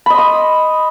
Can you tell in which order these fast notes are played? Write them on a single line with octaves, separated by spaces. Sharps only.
B5 D#5 C6 D#6